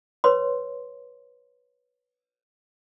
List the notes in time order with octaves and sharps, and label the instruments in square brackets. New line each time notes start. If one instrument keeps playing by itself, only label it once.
[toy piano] B4 C#5 C6